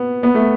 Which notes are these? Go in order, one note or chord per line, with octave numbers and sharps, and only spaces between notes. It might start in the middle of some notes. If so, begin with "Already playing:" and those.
Already playing: B3
B3
A3